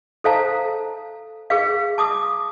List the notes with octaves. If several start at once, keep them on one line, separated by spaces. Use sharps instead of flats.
A4 C5 F5 A5 A#5
G#4 B4 F5
A5 D6 D#6